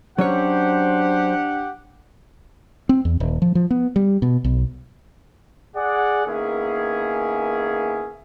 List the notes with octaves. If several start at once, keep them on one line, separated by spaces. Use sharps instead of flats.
F#3 C#4 D4 G4 C5 C#5 F#5
C4
E2
D#1
F3
F3
B3
G3
B2
B1
G#4 D5 F#5
D#3 A#3 B3 C#4 E4 G#4